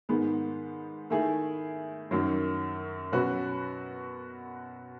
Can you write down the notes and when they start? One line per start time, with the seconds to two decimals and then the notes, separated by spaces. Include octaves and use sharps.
0.09 G#2 D#3 G#3 B3
1.10 D#3 A3 E4 G#4
2.11 F#2 D#3 F#3
3.12 B2 F#3 C#4 F#4 B4